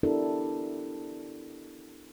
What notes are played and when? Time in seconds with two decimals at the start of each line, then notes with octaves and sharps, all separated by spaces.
0.03 B3 D4 E4 G4 A4 A#4